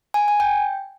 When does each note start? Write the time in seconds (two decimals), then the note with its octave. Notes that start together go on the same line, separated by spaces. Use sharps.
0.14 G#5
0.28 G#5
0.40 G5